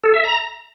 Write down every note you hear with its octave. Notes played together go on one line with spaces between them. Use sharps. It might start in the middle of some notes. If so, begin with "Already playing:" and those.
A4
E5
A#5